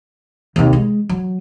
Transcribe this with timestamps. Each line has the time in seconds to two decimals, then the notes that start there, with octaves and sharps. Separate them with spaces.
0.56 D#2 C3
0.73 G#3
1.09 F#3